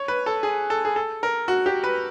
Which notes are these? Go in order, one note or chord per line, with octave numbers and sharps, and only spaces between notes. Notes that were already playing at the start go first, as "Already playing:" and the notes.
Already playing: C#5
B4
A4
G#4
A4
G#4
A4
A#4
F#4
G4
B4